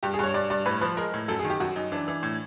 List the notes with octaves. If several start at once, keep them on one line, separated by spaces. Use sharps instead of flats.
G2 G4
G#4
G2 C#5
G2 D5
G2 D5
A2 B4
F3 B4
G#3 A#4
A2
F#2 A4
G#4
D#3
G4
F#2 F#4
F#2 D#4
E3 D4
E3
A2